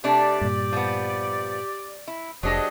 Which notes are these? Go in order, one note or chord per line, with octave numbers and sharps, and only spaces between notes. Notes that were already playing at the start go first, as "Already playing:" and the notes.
C3 A3 D4 G4 D5
G2 A#2
F3 B3
E4
F1 F#3 D4 G4 G#4 C5 D#5